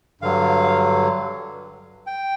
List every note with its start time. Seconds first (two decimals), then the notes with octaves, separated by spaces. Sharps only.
0.21 G2 D3 F#3 F5
2.07 G5